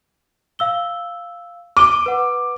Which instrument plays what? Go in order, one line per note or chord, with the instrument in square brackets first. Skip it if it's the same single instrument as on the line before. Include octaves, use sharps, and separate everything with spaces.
[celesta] F5 E6 G7
[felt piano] D6 [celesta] D#7 G7
[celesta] B4 F#5